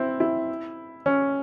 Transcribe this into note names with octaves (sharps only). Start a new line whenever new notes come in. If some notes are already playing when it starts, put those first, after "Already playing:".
Already playing: C4 E4
E4
C#4